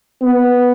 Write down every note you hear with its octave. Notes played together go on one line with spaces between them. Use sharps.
B3